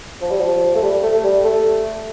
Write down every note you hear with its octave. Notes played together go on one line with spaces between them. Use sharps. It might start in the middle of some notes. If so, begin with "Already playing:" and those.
F3
G3
F3
A3
G3
A3
G3
A3